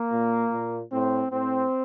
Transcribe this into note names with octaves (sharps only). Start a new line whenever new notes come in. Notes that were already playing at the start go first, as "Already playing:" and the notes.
Already playing: A#3
A#2
A#2
A2 C4
A2 C4